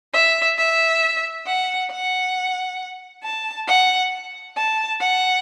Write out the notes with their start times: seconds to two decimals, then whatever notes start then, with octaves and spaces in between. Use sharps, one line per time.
0.14 E5
0.58 E5
1.46 F#5
1.91 F#5
3.24 A5
3.68 F#5
4.57 A5
5.01 F#5